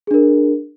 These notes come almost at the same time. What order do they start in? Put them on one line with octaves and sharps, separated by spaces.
G#4 D4 A#4